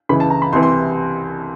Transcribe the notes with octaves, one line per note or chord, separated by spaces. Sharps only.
C#2 C#3 E3 B5
A5
A#5
B5
C2 C3 E3 C6
C6